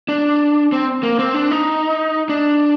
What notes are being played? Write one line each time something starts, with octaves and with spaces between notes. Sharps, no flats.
D4
C4
A#3
C4
D4
D#4
D4